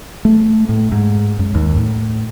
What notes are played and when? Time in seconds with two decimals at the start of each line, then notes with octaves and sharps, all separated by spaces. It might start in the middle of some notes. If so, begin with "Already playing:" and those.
0.25 A3
0.69 A2
0.92 G#2
1.39 F#2
1.55 D#2
1.77 A2